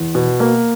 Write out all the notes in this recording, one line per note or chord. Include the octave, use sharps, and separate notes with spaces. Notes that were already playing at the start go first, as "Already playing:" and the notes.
Already playing: E2
B2
A#3